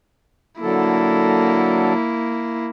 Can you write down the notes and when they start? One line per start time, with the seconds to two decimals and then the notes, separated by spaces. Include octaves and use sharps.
0.61 D3 F#3 A#3 E4 A4